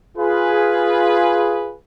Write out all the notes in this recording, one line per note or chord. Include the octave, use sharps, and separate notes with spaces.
F4 G#4 B4